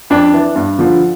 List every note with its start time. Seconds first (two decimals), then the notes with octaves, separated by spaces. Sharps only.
0.10 F2 D4
0.33 E3
0.56 G2
0.79 D3 F3